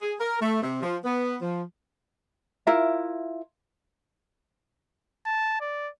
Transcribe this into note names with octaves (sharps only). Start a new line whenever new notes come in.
G#4
A#4
A3
C3
F3
B3
F3
E4 F4 A#4 E5
A5
D5